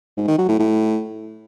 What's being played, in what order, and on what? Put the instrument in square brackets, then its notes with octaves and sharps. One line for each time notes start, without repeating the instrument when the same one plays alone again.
[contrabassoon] G#2
D#3
F#3
A2
A2